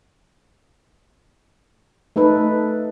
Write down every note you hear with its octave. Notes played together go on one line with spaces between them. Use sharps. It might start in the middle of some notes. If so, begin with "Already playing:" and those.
A3 D#4 A4 B4